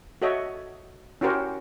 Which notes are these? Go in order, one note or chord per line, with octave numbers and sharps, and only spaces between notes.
F#4 A4 C#5 D#5 E5
C#4 E4 F#4 G4 A#4 C5